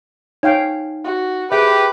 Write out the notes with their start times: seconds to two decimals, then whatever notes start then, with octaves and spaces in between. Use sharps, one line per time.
0.43 D#4 C#5 F5 G5
1.04 F#4
1.52 G4 G#4 B4 E5 G5